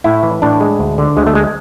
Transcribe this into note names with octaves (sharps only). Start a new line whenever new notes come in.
A2 E4
E3
A2 D4
G#3
D2
D3
D2 G#3
A3
G#3